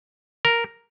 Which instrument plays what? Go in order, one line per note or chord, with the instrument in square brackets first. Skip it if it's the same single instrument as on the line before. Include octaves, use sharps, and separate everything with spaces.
[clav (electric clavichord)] A#4